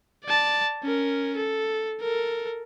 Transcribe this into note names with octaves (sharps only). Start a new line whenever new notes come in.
D5 A5
C#4 A#4
A4
A4 A#4